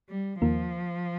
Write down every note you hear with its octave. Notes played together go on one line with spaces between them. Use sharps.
G3
D#2 D#3 F3 A#3 F4 A#4